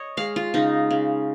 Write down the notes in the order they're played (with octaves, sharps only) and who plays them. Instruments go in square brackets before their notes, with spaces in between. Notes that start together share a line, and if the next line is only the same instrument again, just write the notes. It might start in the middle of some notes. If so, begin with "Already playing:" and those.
Already playing: [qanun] C#5 D#5
G#3 F5
F4
C#3 D#4
C#3